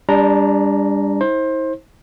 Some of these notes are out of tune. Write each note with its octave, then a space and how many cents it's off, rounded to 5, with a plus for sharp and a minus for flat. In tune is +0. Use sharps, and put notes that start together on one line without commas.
G3 +30 D4 -15 A#5 +0
E4 -45 C5 +25